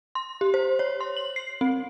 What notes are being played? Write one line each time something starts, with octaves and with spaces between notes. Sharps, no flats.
C6
G4
C5
C#5
C6
F#7
C7
C4